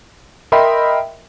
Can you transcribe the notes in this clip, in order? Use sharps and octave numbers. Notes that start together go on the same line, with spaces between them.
A#4 D#5 E5 G5 B5 C6